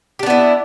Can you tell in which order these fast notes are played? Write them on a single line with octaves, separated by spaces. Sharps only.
G4 D4 B3 E4